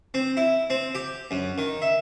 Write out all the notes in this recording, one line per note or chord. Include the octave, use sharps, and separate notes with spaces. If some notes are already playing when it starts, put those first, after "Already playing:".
C4
E4
C4
G4
F#2
D#3
E5